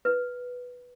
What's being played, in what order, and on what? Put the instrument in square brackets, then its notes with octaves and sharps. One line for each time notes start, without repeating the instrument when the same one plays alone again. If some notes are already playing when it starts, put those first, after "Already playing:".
[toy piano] B4